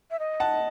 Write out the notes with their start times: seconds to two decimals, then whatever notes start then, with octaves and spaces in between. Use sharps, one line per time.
0.11 E5
0.19 D#5
0.40 F#5 A5